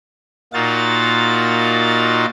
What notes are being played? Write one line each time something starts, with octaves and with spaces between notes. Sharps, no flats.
A#2 D#4 F4 F#4 A6